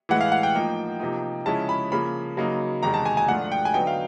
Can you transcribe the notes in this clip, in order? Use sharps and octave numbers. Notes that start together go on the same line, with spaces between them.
A2 E3 G#3 F#5
F5
F#5
G5
A2 F3 A#3 D#4
C3 F3 A#3 D#4
C#3 F3 G#3 C#4 E4 A5
B5
C#3 F3 A#3 B5
C#3 F#3 A#3 D#4
E2 C3 D#3 G#3 A#5
A5
G#5
G#5
G#2 F3 A3 D4 F4 F#5
G5
G#5
D3 F#3 B3 D#4 G5
F5